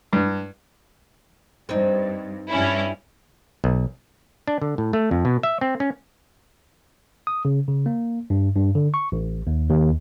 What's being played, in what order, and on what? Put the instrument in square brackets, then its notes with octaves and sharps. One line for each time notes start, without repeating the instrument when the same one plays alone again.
[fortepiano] G2
[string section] G2 [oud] C4 D#4
[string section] G2 C#4 E4
[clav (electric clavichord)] B1
D4
D3
A2
A3
F2
B2
E5
C4
C#4
[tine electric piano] D#6
C#3
C#3
A#3
G2
G2
D3
C#6
A1
D#2
D#2